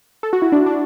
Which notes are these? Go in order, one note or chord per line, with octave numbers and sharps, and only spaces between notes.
A4
F#4
E4
D4
D4